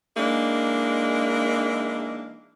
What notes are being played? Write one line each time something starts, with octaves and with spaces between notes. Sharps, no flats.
E3 G#3 A#3 D4 D#4